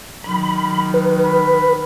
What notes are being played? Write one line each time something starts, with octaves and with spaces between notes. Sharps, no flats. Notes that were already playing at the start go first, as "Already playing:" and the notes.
D#3 F#3 B5
B4
B5